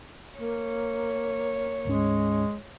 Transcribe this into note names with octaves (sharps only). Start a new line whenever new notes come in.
A#3 C#5
D2 G#2 G#3 C#4